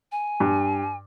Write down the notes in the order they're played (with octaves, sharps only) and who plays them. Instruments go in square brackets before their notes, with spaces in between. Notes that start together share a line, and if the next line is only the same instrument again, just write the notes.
[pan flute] G#5
[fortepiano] G2